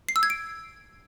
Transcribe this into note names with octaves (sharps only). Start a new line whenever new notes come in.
C7
E6
G#6
D7